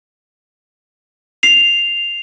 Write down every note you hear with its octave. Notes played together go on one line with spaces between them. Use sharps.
C7 F7